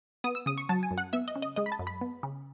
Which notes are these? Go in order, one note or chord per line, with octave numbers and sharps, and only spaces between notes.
B3 D#6
E6
C#3 D#6
C#6
F#3 A5
G#5
F#2
F#5
B3 E5
D#5
C#3
D#5
G#3 D#5
B5
A5
F#2
B5
B3
C#3